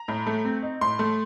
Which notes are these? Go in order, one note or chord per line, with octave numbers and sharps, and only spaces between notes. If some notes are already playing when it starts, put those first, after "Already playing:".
Already playing: A#5
A2
A3
C4
D#4
A2 C6
A3